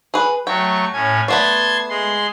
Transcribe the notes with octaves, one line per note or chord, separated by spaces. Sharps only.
G#4 B4
F#3 A3 G5 C#6
A2 C#4 G#5
A3 B3 D5 A5 C6 G#6
G#3 C6